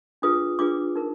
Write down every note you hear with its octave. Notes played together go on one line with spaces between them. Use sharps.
D4 F4 G#4 B4 D#6
D4 F4 G#4 B4 D6
D#4 A#4